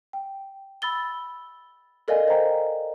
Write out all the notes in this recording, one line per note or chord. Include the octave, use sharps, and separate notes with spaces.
G5
B5 E6 A6 G7
A4 A#4 D5 D#5 F5 G#5
C5 D#5 G5 A#5